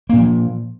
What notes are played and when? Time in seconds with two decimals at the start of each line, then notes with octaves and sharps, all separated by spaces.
0.09 A#3
0.13 A#2
0.17 F3